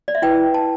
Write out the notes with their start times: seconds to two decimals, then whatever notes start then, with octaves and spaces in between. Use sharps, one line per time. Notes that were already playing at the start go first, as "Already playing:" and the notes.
0.08 D5
0.15 E5
0.22 E4 B4 G5
0.54 A5